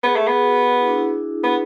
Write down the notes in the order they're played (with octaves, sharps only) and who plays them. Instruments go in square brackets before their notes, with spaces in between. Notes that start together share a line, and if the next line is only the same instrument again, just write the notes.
[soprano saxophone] B3 [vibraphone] G#4
[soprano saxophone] A3
B3
[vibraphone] F#4
E4
D4
E4
[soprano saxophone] B3